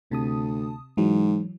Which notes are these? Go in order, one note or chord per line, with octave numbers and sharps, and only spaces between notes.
D2 C3 A5 D#6
G#2 E3 F#3